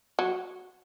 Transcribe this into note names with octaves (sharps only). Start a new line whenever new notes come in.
F#3